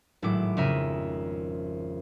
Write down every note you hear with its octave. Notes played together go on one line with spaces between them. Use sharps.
G#1 A2 F#3 E4 D6
F2 C#3 A#4 E5 D#7